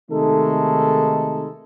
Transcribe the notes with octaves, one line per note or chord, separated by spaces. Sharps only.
C3 D#3 G#3 A3 D#4 A4